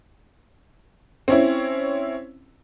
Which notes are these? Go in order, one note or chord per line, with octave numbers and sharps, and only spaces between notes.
C4 C#4 E4